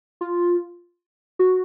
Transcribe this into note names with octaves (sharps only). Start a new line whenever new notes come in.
F4
F#4